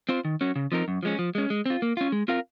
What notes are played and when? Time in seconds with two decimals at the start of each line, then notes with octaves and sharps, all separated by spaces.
0.09 C4 F4 C5
0.25 D#3
0.41 F#3 C#4
0.56 C#3
0.72 F3 C4 D#4 A#4
0.88 F#2
1.03 F3 G#3 C#4
1.19 F3
1.35 G#3 C#4
1.50 G#3
1.66 C4 F4
1.82 A#3
1.97 C#4 F4
2.12 G#3
2.28 C4 F4 A#4 F5